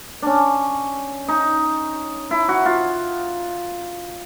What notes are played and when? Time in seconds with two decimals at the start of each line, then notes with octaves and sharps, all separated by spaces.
0.22 C#4 D4
1.28 D#4
2.31 E4
2.49 F#4
2.66 F4